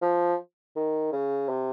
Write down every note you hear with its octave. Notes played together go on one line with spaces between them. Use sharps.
F3
D#3
C#3
C3